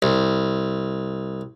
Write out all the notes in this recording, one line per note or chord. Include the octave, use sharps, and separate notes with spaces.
C2